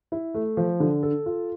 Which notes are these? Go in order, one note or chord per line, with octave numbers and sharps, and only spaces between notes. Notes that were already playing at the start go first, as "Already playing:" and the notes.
E4
A3
F3
D3
A4
F4